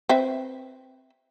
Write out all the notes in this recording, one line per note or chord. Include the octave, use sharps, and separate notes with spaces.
C4 B4 E5